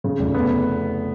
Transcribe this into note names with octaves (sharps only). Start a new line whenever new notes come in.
C#3
F1
B3